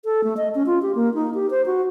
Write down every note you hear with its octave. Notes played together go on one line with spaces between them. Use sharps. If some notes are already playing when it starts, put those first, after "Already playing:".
A4
A3
D#5
C#4
F4
G4
A#3
D#4
G4
C5
F#4